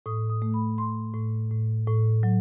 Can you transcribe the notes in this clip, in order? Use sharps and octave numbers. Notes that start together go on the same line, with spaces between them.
A2 D#6
D#6
A3
B5
A3 C6
A2
A2
A2
F#3